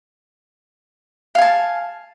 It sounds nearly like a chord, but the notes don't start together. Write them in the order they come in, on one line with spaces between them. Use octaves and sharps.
F5 G#5 A5